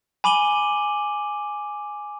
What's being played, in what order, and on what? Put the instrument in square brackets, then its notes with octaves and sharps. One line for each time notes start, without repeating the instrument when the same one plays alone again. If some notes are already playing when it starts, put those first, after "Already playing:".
[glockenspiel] G#5 B5 D6 D#7 F#7 G7